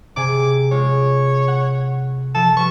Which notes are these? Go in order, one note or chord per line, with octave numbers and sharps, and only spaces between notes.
C3 G#4 G#5 D6
G#3 F4 C#5
F#5
F3 A5
G3 B4 C#6